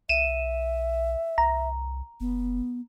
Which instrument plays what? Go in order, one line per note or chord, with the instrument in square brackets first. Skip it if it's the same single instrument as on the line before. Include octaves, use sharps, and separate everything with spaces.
[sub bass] B1 [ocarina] E5 [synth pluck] D#7 E7
[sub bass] C2 [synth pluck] A#5
[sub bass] F#1 [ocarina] B3